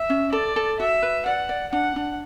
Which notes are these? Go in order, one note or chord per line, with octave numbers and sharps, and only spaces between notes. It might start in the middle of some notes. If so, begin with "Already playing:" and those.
Already playing: E5
C#4
A4 D5
A4
F#4 E5
B4
D5 F#5
D5
D4 F#5
D4